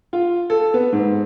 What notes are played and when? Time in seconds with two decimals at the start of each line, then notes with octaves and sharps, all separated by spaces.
0.13 F4
0.50 A4
0.74 B3
0.93 G#2